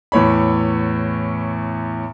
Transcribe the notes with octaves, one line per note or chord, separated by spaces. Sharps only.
E2 A2 C#5 B5